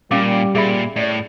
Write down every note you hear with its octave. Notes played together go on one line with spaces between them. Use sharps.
A#2 G3 C#4 F5 D6
A#2 G#4 E5 B5
A2 D5